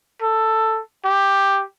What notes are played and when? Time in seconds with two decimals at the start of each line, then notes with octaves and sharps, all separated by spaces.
0.22 A4
1.05 G4